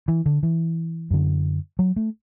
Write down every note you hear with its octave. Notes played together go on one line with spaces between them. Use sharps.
E3
D3
E3
F#2 D3
F#3
A3